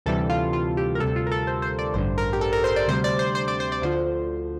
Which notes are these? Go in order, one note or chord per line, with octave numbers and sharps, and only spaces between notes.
D2 C3 E3 G3 A4
F4
F4
G4
A#4
D2 C3 G3 A4
F4
A#4
A4
C5
C5
D5
A1 G2 D3 C5
A#4
G4
A4
A#4
C5
D5
D2 C3 G3 C5
D5
C5
C5
D5
C5
D5
D2 D3 F3 C5